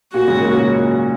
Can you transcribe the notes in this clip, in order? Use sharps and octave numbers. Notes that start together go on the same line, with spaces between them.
A#2 F#4
G#2 C#3
F#3 A#3
F#3 A#3